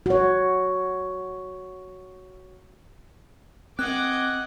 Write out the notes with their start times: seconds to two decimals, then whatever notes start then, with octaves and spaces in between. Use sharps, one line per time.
0.06 F#4 C#5
3.79 C4 D#5 F#5 D6 F#6 G#6